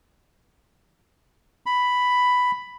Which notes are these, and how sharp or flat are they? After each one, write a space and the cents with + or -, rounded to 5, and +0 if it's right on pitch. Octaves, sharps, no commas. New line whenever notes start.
B5 +5